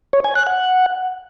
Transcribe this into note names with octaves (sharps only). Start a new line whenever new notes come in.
C#5
G#5
F#6
F#5